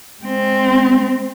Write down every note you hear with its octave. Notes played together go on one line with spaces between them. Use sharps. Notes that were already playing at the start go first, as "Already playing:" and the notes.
G#3 C4